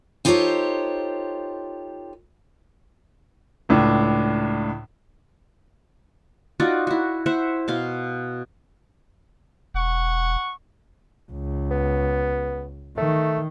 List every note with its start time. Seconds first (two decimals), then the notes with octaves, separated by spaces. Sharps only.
0.25 D#4 F4 G4 A4 C5 C#5
3.69 C#2 A2 D4
6.60 D#4 F4 F#4 D5
6.87 E4 F#4
7.26 E4 C5 E5 F#5
7.68 B2 F5 C6
9.74 E1 F#5 C#6
11.31 C#2
11.71 B3
12.98 D#3 A3